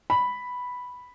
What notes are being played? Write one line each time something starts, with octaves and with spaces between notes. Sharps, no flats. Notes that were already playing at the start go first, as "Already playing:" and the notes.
B5